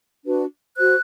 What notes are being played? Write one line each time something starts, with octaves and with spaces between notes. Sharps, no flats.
D4 F#4 B4
F#4 C5 F#6